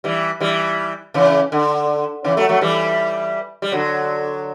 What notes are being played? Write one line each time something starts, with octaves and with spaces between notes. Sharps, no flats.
E3 G3
E3 G3
C#3 E3
D3
C#3 E3
F#3 A3
F#3 A3
E3 G3
G3
D3 F#3